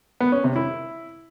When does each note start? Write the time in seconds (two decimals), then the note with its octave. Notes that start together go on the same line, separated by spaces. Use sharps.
0.20 B3
0.32 C#4
0.44 C3
0.56 E4